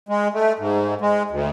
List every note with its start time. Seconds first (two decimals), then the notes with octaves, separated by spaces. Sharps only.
0.09 G#3
0.34 A3
0.59 G#2
1.01 G#3
1.30 D2